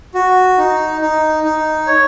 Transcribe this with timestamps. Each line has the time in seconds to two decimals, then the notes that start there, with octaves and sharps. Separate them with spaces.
0.15 F#4
0.58 D#4
1.01 D#4
1.44 D#4
1.87 C#5